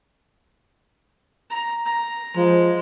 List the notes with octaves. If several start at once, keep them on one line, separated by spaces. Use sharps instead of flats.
A#5
A#5
F3 G#3